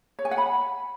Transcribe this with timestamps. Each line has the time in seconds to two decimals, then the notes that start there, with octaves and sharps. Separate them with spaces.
0.19 C#5
0.25 G#5
0.31 F#5
0.38 B5